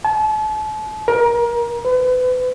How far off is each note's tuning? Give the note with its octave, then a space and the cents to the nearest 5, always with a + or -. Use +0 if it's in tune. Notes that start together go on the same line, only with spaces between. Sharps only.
A5 -40
A#4 +25
B4 +35